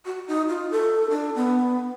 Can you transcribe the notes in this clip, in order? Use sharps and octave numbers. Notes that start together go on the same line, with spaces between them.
F#4
D#4
F4
A4
D4
B3